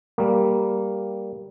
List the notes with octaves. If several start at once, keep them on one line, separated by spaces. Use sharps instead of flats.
G3 A#3